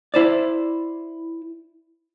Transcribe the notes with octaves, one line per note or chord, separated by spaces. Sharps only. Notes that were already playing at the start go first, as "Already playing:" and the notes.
E4 C5 D5